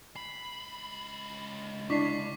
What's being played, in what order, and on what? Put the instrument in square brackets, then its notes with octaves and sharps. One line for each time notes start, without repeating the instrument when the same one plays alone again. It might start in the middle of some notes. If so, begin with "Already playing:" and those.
[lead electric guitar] C#2 B5 [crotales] C7
[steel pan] D4 [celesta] E4 C7 [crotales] C#6 D6 B6